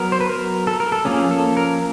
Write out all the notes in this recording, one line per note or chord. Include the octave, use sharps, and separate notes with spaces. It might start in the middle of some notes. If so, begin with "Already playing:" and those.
Already playing: F#3 B3 A#4
C5
B4
A#4
A4
A#4
A4
F3 A#3 C#4 G#4
A4
A#4